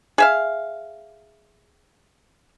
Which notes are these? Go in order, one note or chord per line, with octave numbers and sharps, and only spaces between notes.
G#4 E5 F5